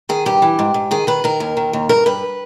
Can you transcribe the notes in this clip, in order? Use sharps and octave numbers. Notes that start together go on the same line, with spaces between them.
D#3 G#4
G2 G4
E3
G#2
G#2
D#3 G#4
D#3 B4
D#3 A#4
D#2
D#3
D#2
G2 A#4
G2 B4